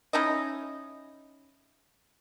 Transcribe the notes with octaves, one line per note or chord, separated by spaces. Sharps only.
C#4 D#4 E4 D#5